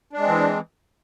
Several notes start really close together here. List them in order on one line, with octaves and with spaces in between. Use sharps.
D4 G#3 C4 E3